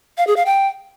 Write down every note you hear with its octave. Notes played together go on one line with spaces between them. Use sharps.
F5
G#4
F5
G5